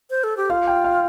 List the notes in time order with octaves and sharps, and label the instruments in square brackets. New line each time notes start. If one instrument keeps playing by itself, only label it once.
[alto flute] C5
A4
G4
[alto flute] F4 [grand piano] F5
[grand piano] G5
F5